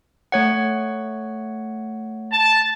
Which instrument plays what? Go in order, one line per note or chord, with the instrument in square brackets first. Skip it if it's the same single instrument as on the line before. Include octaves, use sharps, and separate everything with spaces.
[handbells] A3 C#5 F#5
[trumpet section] A5